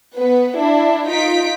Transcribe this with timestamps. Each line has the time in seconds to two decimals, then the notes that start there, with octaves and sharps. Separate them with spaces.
0.15 B3 B4
0.58 D4 E4
1.08 D#4 F4 B6 D7